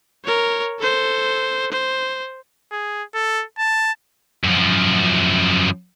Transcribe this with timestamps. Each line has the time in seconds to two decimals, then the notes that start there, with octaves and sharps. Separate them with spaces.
0.25 A#4 C#5
0.79 A4 C5
1.72 C5
2.71 G#4
3.14 A4
3.58 A5
4.44 F#2 F3